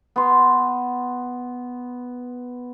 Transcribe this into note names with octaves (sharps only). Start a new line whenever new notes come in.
B3 C6